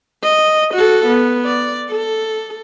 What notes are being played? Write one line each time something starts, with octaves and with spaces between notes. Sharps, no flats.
D#5
F#4 A4
B3
D5
A4